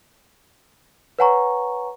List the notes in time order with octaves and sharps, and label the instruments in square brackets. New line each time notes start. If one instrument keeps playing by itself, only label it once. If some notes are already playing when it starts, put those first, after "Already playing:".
[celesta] B4 C#5 F#5 G#5 A#5 C#6